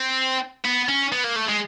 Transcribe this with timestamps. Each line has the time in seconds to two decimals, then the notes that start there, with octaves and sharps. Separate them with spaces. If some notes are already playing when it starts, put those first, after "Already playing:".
Already playing: C4
0.64 B3
0.88 C#4
1.12 B3
1.24 A#3
1.36 A3
1.48 G#3